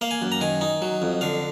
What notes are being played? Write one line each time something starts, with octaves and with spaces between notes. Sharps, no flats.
A#3 F5
G#5
F#2
A#5
D#3 G#5
D#4
F#3
F2
D3 F5